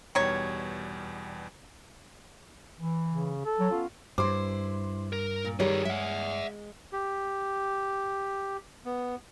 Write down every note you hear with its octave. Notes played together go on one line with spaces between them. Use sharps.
E2 B2 D#3 G3 C#5
E3
C#3
A4
F#3
B3 C#4 F4
G2 E4 C5 C6 D6
A#4
A#2
D#3 G3 G#4 B4 C#5
G#3 E5 F#5
G4
B3